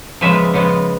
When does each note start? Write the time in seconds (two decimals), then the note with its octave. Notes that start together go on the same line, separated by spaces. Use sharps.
0.21 C#3 F3 G#3 B3 E5
0.54 C#3 F3 G#3 B3